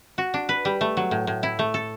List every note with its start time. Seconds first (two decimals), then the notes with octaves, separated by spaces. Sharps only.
0.18 F#4
0.34 D4
0.49 B4
0.65 G3
0.81 A3
0.97 F#3
1.11 A2
1.27 A2
1.43 E4
1.59 A3
1.74 A4